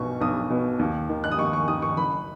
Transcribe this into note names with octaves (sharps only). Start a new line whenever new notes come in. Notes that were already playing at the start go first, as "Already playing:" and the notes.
Already playing: B1 B2 C#6
B1 D#6
B2
D#2
D#3
F#6
D#6
D#2 C#6
C#6
D#3 D#6
C#6
F#1 B5